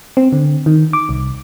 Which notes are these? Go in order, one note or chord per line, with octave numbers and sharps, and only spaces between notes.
C4
D3
D#3
D6
C2